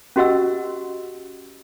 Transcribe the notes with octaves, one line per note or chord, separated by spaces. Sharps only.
C#4 F#4 G4 D#5 F#5 E6